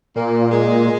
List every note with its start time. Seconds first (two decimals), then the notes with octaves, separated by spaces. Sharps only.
0.16 A#2 A#3
0.51 G#3